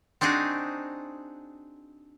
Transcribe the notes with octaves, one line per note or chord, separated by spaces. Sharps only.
C4 D4 D#4 F#4 G#4